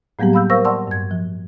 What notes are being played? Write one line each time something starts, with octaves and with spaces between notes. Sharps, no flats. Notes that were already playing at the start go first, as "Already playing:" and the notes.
A2 F#3 G3 A#3 B3 G4
F5 B5 E6 G6
A#4 C5 F5 C#6 E6 A#6
D5 F#5 A5 C6 C#6 E6
G2 G#6
F3